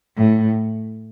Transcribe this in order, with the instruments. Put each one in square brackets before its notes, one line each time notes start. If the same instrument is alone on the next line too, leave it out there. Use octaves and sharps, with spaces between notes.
[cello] A2